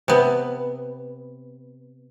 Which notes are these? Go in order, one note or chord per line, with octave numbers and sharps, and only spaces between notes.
C3 B3